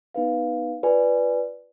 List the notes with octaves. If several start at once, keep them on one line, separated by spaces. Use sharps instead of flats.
B3 D#4 B4 F5
F4 B4 D5 G#5